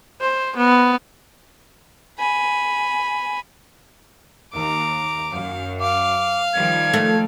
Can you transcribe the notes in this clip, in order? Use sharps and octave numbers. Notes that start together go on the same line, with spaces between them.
C5
B3
G#5 B5
D#2 A#5 D6
F#2 F5
F5 D6
D#3 F3 G3 G#6
A3